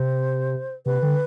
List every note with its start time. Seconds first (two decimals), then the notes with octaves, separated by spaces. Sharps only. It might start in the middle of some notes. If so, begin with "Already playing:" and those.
Already playing: C3 C5
0.86 C3 B4
1.02 D3